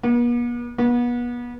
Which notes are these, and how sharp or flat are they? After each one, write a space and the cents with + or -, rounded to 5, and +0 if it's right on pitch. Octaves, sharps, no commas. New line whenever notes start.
B3 -45
B3 -30